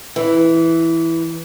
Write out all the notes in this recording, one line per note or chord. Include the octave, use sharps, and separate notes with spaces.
E3